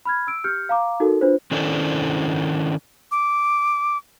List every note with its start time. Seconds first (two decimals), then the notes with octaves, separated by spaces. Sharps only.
0.05 B5 F6 G#6
0.27 E6 D7
0.44 G4 F6 G6 C#7
0.69 F5 A#5 D6
1.00 D#4 F#4 A4 A#4
1.21 D4 F4 B4 C5
1.51 D#3 C#4 D4 E4 A4 C5
3.11 D6